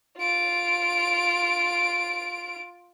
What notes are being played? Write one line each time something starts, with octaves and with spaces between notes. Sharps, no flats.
F4 D7